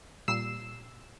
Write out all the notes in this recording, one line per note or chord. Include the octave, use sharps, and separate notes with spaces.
A#2 G3 E6 C7 E7